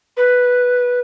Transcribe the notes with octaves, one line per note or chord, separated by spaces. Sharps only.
B4